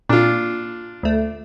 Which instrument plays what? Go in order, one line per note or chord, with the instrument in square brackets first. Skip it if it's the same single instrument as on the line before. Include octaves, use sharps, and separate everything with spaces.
[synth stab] A#2 [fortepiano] D4 F4
[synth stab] D2 A3